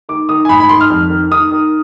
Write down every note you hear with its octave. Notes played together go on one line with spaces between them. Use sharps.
D#3 D6
D#3 D#6
G#5
G#2 B5
B5
D#3 C6
F6
F2
D#3
D#3 D#6
D#3